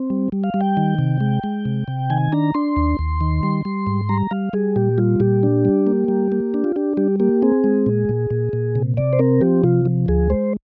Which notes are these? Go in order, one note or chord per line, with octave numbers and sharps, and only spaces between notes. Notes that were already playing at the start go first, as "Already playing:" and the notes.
Already playing: C4
G3
G3
F5
G3
G5
D#3
C3
G#3
G#3
C3
C3
D#3 G#5
D4 A#5
D4 C6
D#2
D#2
D#3
G3
G3
G#2
G3 A#5
G3 F5
G3 G#4
A#2 G4
G3 F4
A#2 G4
D4
G3
A#3
G3
A#3
D4
F4
D4 G4
G3 G4
A#3 G4
C4 G#4
G#3
A#2
A#2
A#2
A#2
C3
C3 D5
C5
C4 A#4
F3 G4
C3 F4
F3
D2 G#4
G#3 C5